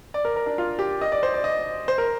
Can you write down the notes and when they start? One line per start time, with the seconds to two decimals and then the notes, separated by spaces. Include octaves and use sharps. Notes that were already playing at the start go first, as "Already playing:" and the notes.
0.14 D5
0.25 A#4
0.36 A#4
0.46 D4
0.58 F4
0.79 G4
1.01 D#5
1.12 D5
1.23 C5
1.34 D5
1.44 D#5
1.88 C5
1.98 A#4